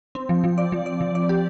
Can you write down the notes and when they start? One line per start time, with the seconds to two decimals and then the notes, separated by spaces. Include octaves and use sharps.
0.15 C4
0.29 F3
0.44 F3
0.58 D5
0.72 F3
0.86 D5
1.01 F3
1.15 D5
1.29 G4